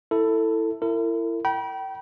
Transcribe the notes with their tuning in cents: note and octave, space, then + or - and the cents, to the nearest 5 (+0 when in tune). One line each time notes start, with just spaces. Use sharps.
E4 +0 A4 +15
E4 +25 A#4 -45
G5 -25 B5 -40